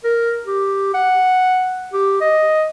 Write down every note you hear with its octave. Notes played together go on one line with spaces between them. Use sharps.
A#4
G4
F#5
G4
D#5